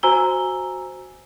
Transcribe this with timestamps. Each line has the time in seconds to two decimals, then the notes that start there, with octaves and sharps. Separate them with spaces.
0.03 F#4 C5 G#5 A#5 E6 G7